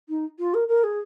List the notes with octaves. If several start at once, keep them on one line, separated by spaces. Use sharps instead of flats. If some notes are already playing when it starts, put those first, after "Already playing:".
D#4
F4
A#4
A#4
G#4